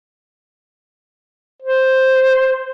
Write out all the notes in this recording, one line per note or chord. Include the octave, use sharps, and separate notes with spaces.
C5